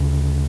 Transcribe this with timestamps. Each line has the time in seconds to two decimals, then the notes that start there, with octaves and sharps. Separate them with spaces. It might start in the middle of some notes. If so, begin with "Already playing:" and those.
Already playing: D2 C#3